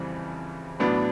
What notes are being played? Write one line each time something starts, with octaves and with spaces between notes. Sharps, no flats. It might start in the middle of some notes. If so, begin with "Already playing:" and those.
Already playing: F2 C#3 E3 G3 C4
A1 A2 F#3 B3 D4